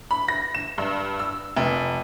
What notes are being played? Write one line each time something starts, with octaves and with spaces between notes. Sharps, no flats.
B5
A#6
E7
G2
E6
F1